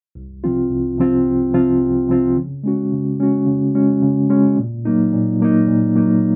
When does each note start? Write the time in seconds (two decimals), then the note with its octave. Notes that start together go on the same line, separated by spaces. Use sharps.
0.15 C2
0.44 C3 F3 C4 F4
0.71 C2
0.98 C3 F3 C4 F4
1.26 C2
1.54 C3 F3 C4 F4
1.81 C2
2.09 C3 F3 C4 F4
2.37 C#3
2.63 G#3 C#4 F#4
2.92 C#3
3.20 G#3 C#4 F#4
3.46 C#3
3.75 G#3 C#4 F#4
4.02 C#3
4.30 G#3 C#4 F#4
4.57 A#2
4.85 F#3 A#3 D#4
5.13 A#2
5.40 F#3 A#3 D#4
5.68 A#2
5.95 F#3 A#3 D#4